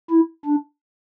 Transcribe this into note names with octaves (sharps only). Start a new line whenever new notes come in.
E4
D4